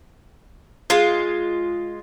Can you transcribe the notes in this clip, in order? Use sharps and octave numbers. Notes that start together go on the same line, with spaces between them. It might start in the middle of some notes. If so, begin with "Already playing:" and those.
G#3 F4